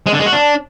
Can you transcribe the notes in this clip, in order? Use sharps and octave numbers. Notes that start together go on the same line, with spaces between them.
G#3
D3
G#3
F#4
D4